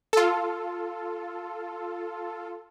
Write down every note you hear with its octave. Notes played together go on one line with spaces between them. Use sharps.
F4 A4